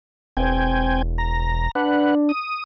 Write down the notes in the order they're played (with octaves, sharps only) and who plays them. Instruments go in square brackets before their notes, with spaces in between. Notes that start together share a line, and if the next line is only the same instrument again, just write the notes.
[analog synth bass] E1 [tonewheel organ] C4 G5 G#5
[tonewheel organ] A#5
[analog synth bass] D4 [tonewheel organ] B4 F#5
[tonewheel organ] D#6